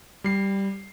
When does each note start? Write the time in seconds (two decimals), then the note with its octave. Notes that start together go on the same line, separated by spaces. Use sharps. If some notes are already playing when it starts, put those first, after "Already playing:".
0.24 G3 C7